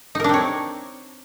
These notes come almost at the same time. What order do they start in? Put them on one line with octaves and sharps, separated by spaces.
D#4 A#4 D4 C4 C#5